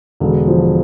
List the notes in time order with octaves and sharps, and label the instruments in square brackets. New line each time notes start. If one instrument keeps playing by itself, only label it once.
[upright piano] E1 [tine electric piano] D3
[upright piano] F3